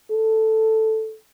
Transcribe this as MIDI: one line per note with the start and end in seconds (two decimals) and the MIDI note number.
0.11 1.16 69